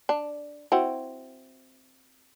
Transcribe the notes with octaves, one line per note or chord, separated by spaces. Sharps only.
D4
C4 E4 F#4